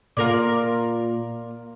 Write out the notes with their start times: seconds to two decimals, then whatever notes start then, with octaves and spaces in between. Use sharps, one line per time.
0.17 A#2 F4 A#4 D5